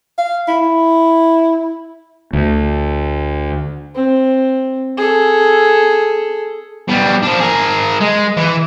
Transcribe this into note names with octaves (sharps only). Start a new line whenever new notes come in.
F5
E4
D2
C4
G#4 A4
B2 G3
F3 D4
G#4 A#4
G#3
E3